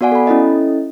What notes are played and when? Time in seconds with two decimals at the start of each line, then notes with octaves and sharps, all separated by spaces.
0.01 B3 F#4 D5 F#5 G#5
0.12 A4 B5
0.27 C#4 E4 A4 D#5